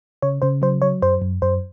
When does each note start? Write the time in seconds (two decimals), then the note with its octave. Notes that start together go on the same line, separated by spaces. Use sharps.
0.22 C#3 C#5
0.42 C#3 C5
0.62 F#3 C5
0.82 F#3 C#5
1.02 F#2 C5
1.22 F#2
1.42 F#2 C5